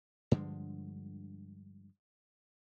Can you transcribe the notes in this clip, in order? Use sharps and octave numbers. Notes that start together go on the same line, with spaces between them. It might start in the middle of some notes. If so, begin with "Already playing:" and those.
G2 D3 F3 G#3